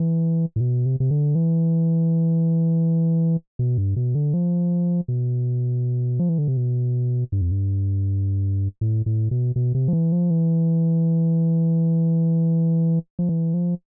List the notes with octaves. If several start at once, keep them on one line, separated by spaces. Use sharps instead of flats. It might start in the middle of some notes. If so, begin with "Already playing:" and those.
Already playing: E3
A2
B2
C3
C3
D3
E3
B2
G2
B2
D3
F3
B2
F3
E3
D3
C3
B2
G2
F2
G2
A2
A2
B2
B2
C3
F3
E3
F3
E3
F3
E3
F3